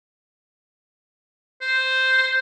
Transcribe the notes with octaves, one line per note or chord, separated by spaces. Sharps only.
C5